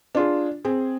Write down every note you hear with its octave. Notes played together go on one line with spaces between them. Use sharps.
D4 F4 G#4
C4 G#4